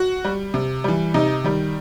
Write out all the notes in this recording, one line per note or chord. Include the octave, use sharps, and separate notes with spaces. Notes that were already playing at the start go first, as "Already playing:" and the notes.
Already playing: F#4
G3
C3
E3 G3
C3 D#4
D#3 G3